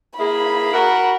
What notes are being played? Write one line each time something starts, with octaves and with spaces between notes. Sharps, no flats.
A#3 E4 G#4 B5
F#4 A#4